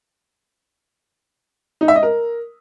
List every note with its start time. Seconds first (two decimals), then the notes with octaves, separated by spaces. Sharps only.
1.81 D#4
1.88 E5
1.95 D#5
2.03 A#4